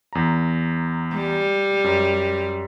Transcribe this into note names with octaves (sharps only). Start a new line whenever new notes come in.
E2 A#5
G3
F#2